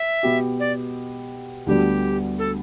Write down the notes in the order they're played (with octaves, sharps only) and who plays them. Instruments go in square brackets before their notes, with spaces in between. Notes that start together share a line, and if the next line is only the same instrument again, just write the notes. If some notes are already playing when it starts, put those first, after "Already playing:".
Already playing: [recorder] E5
[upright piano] B2 B3 G4
[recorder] D5
[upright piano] D2 D3 G3 B3 D4 [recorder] G4
[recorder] A4